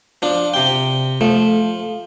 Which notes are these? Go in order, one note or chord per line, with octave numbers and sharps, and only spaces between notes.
F3 D4
C3 G5
F3 A3